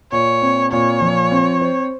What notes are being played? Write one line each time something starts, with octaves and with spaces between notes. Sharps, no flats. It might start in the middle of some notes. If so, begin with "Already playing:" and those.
A#2 C#5
C4
A#2 C#5
F3
C4
C5